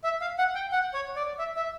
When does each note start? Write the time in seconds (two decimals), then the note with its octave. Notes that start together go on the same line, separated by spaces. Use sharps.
0.04 E5
0.21 F5
0.38 F#5
0.55 G5
0.72 F#5
0.94 C#5
1.16 D5
1.39 E5
1.56 E5